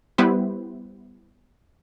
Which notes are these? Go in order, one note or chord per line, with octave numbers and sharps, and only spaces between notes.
G3 B3 E4 G4 B4 C5